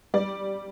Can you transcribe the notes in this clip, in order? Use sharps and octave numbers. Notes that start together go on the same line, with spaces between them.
G3 D5